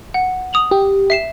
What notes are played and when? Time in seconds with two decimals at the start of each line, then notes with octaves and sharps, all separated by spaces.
0.14 F#5
0.53 D#6 F7 F#7
0.71 G4
1.10 E5 C7 E7